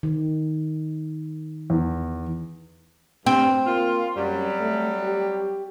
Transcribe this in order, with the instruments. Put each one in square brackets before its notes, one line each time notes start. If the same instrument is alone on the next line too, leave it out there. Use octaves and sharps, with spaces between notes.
[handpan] D#3
[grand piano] E2
[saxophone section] G2 [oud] C4
[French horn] A#3 [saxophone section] F4
[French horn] F#2 [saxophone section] F#3 G3
[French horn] A3
G4